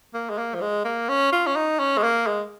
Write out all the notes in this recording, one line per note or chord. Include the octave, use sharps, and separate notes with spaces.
A#3
G#3
A#3
F3
G#3
A#3
C#4
F4
C#4
D#4
C#4
G#3
A#3
G#3